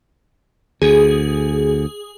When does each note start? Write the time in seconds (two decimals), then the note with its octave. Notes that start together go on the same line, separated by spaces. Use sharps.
0.82 D2 G#4